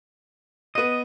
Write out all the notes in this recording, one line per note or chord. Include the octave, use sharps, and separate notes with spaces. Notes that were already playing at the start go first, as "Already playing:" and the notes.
B3 D#5 D#7